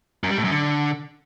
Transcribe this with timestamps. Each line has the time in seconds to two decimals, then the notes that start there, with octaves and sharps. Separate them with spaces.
0.24 F#2
0.30 G3
0.37 A2
0.44 F#2
0.51 D3